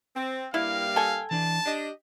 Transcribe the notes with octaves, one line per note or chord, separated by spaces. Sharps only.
C4
G2 G3 A#3 E4 F5
A4 G5 G#5
E3 D4 A5
D4 G4 D#5